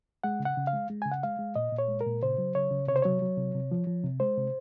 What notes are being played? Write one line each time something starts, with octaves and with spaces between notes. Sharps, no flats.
G#3 F#5
C#3
F#5
C#3
F5
G#3
G#3
C#3 G#5
F#5
G#3 F5
G#3
A#2 D#5
A#2
C#5
G#3
A#4
A#2
C#3 C5
F#3
C#3 C#5
C#3
C3 C#5
C5
F#3 C#5
F#3
C3
C3
F3
F3
C3
G#3 C5
C3